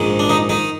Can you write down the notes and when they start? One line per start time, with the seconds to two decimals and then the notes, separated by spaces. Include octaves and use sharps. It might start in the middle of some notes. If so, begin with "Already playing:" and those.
Already playing: A#1 G#2 D#3
0.19 D4
0.29 D#3 D#4
0.49 D#3 D#4